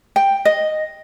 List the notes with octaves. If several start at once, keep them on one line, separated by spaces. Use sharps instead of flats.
G5
D#5